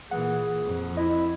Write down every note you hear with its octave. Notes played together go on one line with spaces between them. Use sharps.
A#2 E3 G#4 F#5
F2
E4 D#5